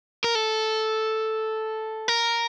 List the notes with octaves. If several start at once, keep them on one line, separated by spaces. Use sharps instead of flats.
A#4
A4
A#4